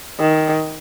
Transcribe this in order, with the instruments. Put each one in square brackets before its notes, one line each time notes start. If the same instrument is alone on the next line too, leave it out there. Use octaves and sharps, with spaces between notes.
[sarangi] D#3